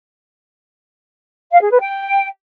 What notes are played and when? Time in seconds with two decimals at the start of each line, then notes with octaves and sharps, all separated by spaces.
1.51 F5
1.60 G#4
1.70 B4
1.79 G5